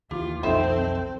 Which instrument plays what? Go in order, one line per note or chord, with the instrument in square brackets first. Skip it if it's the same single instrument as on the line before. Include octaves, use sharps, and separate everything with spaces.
[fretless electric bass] D#2 E3 [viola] F4 [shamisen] G4
[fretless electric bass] B1 F2 D#3 [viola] C4 [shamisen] D#4 C5 E5 [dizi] A4